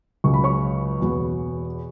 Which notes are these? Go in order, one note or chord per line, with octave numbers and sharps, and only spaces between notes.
C#2 C#3 F#3 C#6
B5
C#5 C#6
E2 B2 B3